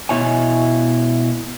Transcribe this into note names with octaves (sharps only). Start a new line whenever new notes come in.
B2 E4 C#5 G#5